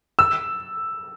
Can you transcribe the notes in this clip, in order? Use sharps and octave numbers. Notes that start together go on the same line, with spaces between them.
E6